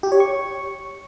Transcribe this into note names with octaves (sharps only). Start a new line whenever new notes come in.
G4
C#5
C#6